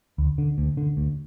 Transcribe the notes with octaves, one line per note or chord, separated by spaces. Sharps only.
D2
D3
D2
D3
D2